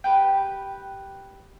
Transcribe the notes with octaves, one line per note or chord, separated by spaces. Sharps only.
G4 B4 G5